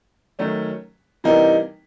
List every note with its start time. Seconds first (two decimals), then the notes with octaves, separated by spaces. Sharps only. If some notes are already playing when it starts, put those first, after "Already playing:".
0.39 D#3 F#3 A3 C#4
1.24 C3 E3 G3 A#3 D#4